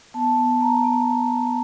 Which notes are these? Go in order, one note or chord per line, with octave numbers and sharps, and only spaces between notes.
B3 A5
B3
B3 A#5
B3